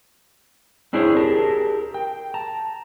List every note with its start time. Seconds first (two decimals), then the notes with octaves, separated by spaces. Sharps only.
0.93 C4 D4 E4 G#4 C5 C#5
1.16 G4 G#4 A#4 A5
1.94 G5
2.34 A5 A#5